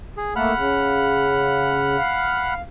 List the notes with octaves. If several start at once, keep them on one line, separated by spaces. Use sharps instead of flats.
G#4
A3 A#3 A4 F#5 B5 F6
C#3
F5